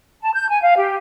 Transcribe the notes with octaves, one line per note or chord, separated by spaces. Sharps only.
A5
G6
G#5
F5
G4